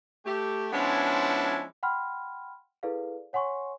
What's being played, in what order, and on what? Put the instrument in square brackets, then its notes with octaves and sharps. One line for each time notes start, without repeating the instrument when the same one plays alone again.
[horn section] A3 G4
F3 G#3 B3 C#4 D4 E4
[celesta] F#5 G5 B5 C6 F6
E4 G#4 A4 B4 D5 F5
C#5 F#5 G#5 C6 C#6